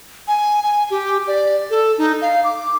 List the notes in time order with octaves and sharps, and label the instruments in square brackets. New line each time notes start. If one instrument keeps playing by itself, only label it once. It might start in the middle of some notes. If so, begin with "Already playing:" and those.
[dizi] G#5
G#5
G4
D5
A4
D#4
F5
D6